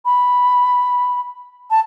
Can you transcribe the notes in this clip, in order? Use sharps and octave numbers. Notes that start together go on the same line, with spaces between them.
B5
A5